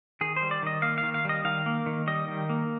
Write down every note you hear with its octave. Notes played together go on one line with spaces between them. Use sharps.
D#3 G#4
C5
G3
D5
D#3 D#5
A#3 F5
F5
D#3
F5
G3 D#5
D#3 F5
A#3
D#3
G3 D#5
D#3
A#3